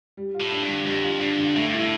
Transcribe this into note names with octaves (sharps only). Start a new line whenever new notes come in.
G3
F4
A2
D4
G2
D3
F2 G3
F4
G2 D4
D3
A2 A3
G2
A2 E4